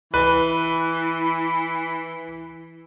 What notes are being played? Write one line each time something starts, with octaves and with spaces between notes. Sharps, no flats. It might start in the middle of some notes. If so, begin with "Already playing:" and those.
E3 B4